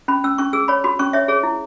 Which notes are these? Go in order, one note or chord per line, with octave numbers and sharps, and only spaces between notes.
C#4 B5
C#4 E6
C#4 C#6
G#4 E6
C#5 B5
F#4 B5
C#4 C#6
C#5 E5
G#4 C#5
E4